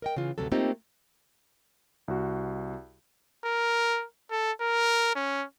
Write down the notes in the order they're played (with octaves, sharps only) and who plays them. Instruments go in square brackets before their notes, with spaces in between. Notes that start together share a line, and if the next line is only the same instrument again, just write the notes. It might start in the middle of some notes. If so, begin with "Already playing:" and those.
[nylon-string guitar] A#4 D#5 G5
C#3 E3 F4
D2 G2 C3 F#3 A4
A3 A#3 C4 D#4 F4 G4
[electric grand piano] C2 F#4
[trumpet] A#4
A4
A#4
C#4